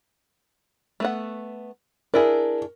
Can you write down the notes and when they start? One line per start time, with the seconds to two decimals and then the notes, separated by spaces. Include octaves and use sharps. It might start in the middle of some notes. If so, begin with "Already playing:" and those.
1.00 A3 B3 F#5
2.14 D4 E4 G#4 A#4